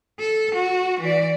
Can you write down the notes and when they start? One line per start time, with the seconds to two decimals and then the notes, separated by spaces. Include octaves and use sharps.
0.19 A4
0.55 F#4
1.00 E3 D5